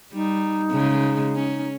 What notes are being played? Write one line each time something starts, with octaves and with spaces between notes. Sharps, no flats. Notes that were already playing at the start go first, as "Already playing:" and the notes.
G3 D#4
C#3 G#3
C#4